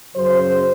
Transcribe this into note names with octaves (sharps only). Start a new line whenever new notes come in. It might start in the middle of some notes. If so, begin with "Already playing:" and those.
F#2 C#3 F#3 C5